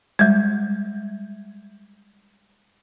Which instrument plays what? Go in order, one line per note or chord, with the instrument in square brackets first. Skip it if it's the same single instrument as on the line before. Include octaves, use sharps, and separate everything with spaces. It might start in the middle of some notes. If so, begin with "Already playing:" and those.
[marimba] G3 G#3